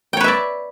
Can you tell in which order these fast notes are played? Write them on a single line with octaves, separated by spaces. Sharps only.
G5 C#5 B4 E5 D5